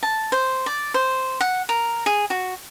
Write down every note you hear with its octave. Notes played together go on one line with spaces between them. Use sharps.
A5
C5
D5
C5
F#5
A#4
G#4
F#4